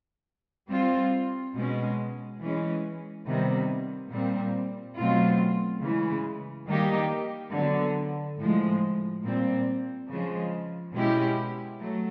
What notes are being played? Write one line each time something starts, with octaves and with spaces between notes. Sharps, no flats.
G3 C4 F4
B2 G#3 C#4
E3 G#3 C#4
C3 D#3 G3 B3
A#2 G3 C4
B2 F#3 A3 C4 F4
C#3 E3 G#3
D#3 G3 A#3 D#4 G4
D3 F#3 B3
A2 F3 G#3
A#2 G3 C4
C#3 F3 G#3
B2 G#3 C#4 E4 G4
F#3 A3